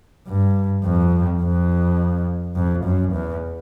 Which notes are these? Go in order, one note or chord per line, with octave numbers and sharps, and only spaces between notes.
G2
F2
F2
F2
F#2
E2